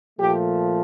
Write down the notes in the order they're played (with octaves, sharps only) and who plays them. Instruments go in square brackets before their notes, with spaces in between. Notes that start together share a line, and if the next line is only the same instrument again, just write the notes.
[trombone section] A#2 F3 A3 G4